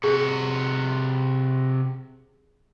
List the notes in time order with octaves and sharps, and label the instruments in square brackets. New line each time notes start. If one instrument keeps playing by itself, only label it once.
[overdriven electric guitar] C3 F#4 [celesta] G#4